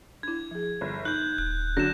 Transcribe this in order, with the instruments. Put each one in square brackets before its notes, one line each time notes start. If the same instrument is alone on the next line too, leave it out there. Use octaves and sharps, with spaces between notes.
[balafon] D4 E4 [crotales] G#6
[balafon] F3 G#4
[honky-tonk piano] G1
[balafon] D#4 [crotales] F#6 G6 [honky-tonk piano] F#7
[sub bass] D#1 [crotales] F#6
[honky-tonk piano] D3 F#3 [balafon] F#4 [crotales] A#6 E7